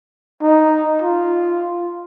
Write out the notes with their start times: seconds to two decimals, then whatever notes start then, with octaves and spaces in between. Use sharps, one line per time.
0.41 D#4
1.02 F4